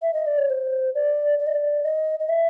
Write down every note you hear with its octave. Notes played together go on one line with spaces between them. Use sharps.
E5
D#5
D5
C#5
C5
D5
D5
D#5
D5
D#5
D#5
E5